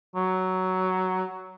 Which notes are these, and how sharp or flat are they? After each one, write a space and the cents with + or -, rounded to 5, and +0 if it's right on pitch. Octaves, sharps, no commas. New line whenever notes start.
F#3 +10